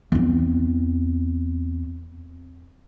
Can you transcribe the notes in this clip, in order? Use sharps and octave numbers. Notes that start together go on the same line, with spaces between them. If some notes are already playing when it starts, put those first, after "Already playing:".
E2 C4